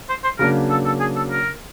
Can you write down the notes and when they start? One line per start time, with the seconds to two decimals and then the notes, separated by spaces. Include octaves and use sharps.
0.09 C5
0.24 C5
0.39 C#3 F#3 A#3 D4 A#4
0.70 A4
0.86 A4
1.00 G#4
1.16 A4
1.31 A#4